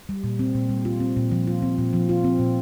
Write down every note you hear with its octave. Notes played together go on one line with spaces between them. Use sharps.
G3
A#2
C4
A#2
G3
F4
C4
A#2
F3
F4
C4
A#2
F3
F4
C4
A#2